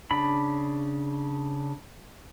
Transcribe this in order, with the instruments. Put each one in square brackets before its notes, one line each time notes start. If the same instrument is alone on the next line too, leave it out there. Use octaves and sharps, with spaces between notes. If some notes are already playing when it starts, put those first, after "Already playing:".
[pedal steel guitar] C#3 D4 B5